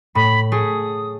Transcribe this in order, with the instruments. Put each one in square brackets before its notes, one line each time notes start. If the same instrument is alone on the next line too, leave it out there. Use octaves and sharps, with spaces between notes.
[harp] A2 [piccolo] B5
[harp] A3 G#4 [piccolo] D#6